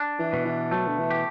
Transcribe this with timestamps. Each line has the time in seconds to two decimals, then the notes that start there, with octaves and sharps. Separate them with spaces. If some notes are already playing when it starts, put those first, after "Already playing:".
Already playing: D4
0.19 E3
0.33 B2
0.45 E3
0.71 F#3 A3
0.86 D3
0.98 E3
1.10 G4